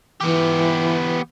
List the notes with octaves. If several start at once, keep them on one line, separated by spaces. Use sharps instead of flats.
E3 B3 G4